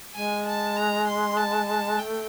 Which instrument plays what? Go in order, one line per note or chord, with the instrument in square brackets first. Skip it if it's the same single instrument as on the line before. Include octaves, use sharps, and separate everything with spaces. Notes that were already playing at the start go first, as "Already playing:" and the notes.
[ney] G#3 [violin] G#5
[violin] A5
A#5
C6
A5
A5
[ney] A3 [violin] G5